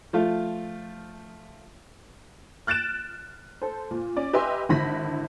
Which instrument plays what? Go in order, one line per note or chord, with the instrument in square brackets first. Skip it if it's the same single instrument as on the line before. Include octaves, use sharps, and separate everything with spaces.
[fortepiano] F3 A3 F4
[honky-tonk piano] F6 F#6 A6 D7 E7
A4 C5
A#2
C#4 D5
G4 B4 D#5 E5 G#5 C6
G#1 D3 E4 B5 A#6 B6